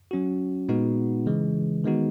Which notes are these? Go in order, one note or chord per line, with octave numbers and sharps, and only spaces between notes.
F#3 C#4 F#4
A#2 G#3 B3 D#4 F#4
C#3 E3 G#3
D#3 G#3 B3 D#4 F#4